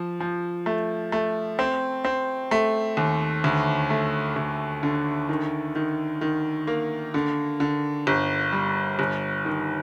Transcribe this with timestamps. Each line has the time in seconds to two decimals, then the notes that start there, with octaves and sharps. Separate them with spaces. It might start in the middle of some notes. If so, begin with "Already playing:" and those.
Already playing: F3
0.20 F3
0.66 A3
1.12 A3
1.59 C4
2.05 C4
2.51 A3
2.97 D#2
3.44 D2
3.90 A3
4.36 D2
4.83 D3
5.29 D#3
5.75 D#3
6.21 D#3
6.67 A#3
7.14 D3
7.60 D3
8.07 G1
8.52 G3
8.99 G1
9.45 D#3